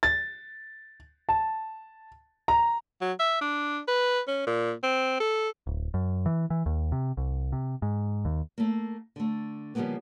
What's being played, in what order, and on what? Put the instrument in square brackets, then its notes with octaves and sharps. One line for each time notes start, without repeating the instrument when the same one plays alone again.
[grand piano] A6
A5
A#5
[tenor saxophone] F#3
E5
D4
B4
C#4
A#2
C4
A4
[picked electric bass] D1
F#2
E3
E3
D#2
C3
C2
C3
G#2
D#2
[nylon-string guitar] A3 A#3
D3 A3
C#3 F3 G3 G#3 A#3 B3